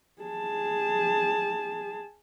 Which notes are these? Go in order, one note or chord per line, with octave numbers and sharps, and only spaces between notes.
G#4 A5